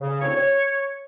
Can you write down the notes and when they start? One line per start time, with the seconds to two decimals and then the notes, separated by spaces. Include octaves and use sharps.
0.01 C#3
0.21 D2 A2 C4 C#5
0.35 C#5